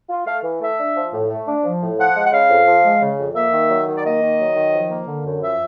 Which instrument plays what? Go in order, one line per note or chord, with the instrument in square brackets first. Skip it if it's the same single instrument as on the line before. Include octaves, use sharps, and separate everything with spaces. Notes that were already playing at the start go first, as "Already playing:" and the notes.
[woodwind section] F4
A3 F5
E3
A3 E5
D4
F3
A2
A3
D4
F3
A2
F3 F#5
G#3
F#5
C#3 F5
F2
F3
G#3
C#3
F2
A#3 E5
D#3
F#3
D#3
D5
A#3 D#5
D#3
F#3
D#3
F3
A#3
D3
F#2
F3 E5